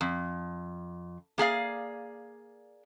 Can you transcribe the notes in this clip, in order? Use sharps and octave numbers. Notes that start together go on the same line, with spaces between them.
F2
A#3 G#4 D5 F5